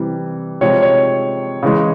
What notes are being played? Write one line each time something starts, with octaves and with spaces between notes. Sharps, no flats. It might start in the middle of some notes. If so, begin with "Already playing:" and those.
Already playing: C3 E3 G3
C3 F3 G#3 C#5
C#5
C#3 E3 G#3